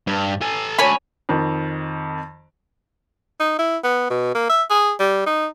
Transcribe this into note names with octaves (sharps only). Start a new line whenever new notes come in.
G2
A4 G#5
D4 F#4 C#5 G#5 B5
F2 D#3
D#4
E4
B3
B2
A#3
E5
G#4
G3
D#4